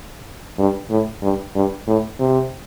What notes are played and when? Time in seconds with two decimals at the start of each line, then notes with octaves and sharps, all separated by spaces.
0.58 G2
0.90 A2
1.22 G2
1.55 G2
1.87 A2
2.20 C3